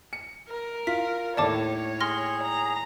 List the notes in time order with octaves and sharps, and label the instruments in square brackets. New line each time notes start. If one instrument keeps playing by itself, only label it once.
[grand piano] C#7
[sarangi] A#4
[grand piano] F4 [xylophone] B6
[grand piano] D#2 A2 [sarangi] C#5 [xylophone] D5 A5 D6
[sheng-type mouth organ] G#4 [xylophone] C6 F6 A#6
[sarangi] A#5